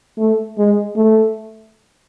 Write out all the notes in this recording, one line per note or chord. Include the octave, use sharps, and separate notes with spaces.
A3
G#3
A3